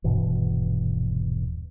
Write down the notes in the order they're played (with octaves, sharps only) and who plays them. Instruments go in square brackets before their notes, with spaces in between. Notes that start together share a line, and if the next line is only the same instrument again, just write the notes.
[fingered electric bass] D#1 G2 B2 E3